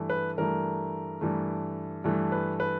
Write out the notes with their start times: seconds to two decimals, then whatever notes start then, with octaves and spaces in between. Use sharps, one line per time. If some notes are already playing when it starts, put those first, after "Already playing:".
Already playing: G2 E3 A3
0.10 B4
0.38 G2 E3 A3 A#4
1.21 G2 E3 A3
2.04 G2 E3 A3
2.32 B4
2.60 B4